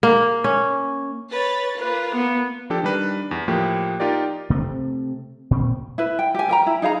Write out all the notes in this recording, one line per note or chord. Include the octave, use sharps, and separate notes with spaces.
A#3
C#4
B4 C#5 A6
A#3 F4 B4
B3
F3 D4 G4 A4
D#3 G3 D4 B4
E2
A2 F3 A#3 G4
D#4 F4 G4 A#4 D5
C3 A3 B3 C4
A#2 C4
E4 B4
G5
G4 G#5
A#4 G5 A#5
E4
D#4 G#4 F5 A#5